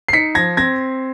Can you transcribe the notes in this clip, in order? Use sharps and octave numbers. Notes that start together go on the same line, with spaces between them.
C7
D#4 B6 C#7
F3 G#6 A#6
C4 G#6 A#6